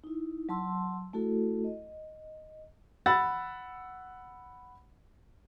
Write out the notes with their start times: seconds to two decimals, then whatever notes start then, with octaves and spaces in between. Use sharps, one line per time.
0.04 D#4 E4
0.49 F#3 A5 C6 E6
1.13 A3 E4 F#4 A4
1.64 D#5
3.06 F#5 B5 E6 F#6 A6